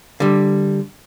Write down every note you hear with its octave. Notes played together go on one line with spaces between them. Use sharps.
D3 G3